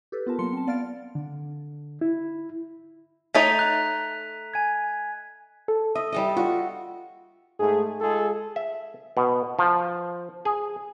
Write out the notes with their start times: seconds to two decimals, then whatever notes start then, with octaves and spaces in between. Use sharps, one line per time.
0.12 G4 A4 B4
0.26 B3 F4 A#4 A5
0.39 F#3 A#3 C6 C#7
0.53 C4 A5
0.67 B3 D5 F5 F6 A6 D7
1.15 D3
2.01 E4
3.35 A3 D#4 C#5 B6 D#7 F7
3.59 F#6
4.54 G#5 G#6
5.68 A4
5.95 D#5 E5
6.12 G3 A4 D#5
6.37 F4 F#4
7.60 G#2 A3 G#4
8.01 G#3 F4 G#4 A4
8.56 E5
9.17 B2
9.59 F3
10.45 G#4